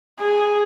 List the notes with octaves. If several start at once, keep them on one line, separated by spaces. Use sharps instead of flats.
G#4